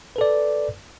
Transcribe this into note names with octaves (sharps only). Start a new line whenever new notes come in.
A4 B4 D5